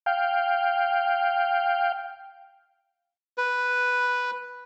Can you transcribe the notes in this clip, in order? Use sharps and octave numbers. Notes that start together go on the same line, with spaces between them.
F5 G5
B4